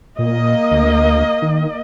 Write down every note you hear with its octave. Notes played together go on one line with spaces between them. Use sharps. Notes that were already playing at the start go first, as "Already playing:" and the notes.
A#2 A#3 D#5
D2
D#3